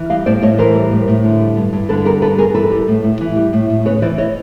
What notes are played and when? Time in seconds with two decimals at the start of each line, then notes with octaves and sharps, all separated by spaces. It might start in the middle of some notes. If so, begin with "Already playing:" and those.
Already playing: E3
0.10 G3 D#5 F5
0.26 A2 C5 D5
0.42 A2 C#5 D#5
0.58 E3 A#4 C5
0.74 G3
0.91 A2
1.08 A2
1.24 D3
1.40 G3
1.57 G2
1.73 G2
1.89 D3 A4 B4
2.05 G3 G#4 A#4
2.22 G2 A4 B4
2.38 G2 G#4 A#4
2.55 E3 A4 B4
2.72 G3
2.88 A2
3.04 A2
3.21 E3
3.36 G3
3.53 A2
3.70 A2
3.85 C#3 B4 C#5
4.02 E3 C5 D5
4.18 C#5 D#5